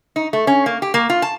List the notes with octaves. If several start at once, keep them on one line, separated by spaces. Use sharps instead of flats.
D#4
A3
C#4
A#3
G4
A#3
F4
A5